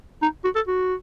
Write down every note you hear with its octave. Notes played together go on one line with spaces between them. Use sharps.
D#4
F#4
A4
F#4